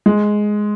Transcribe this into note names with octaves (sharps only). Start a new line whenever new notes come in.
G#3